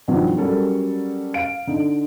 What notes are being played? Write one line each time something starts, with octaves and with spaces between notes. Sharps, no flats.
G2 B2 D#3 F3 F#3
F#3 G3 C#4 A4 A#4
F5 D7
D3 D#4